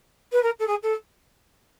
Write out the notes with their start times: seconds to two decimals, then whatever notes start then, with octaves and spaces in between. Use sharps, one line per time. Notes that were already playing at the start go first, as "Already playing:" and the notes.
0.32 B4
0.43 A#4
0.60 A4
0.67 G#4
0.83 A4